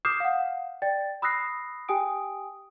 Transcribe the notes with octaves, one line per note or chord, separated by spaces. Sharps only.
D6 D#6 F6 G6 C7 E7
F5 F#5
D5 G5 A6
B5 D#6 E6 F#6 A#6 C7
G4 G5 G#5 D#6 D7